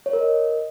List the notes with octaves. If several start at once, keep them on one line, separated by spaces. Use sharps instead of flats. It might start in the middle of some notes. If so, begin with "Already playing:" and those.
C#5
A#4
D#5